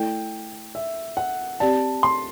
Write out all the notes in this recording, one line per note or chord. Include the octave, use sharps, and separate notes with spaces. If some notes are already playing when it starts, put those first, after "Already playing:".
Already playing: A3 E4 A4 D5 G5
E5
F#5
C4 G4 D5 A5
C6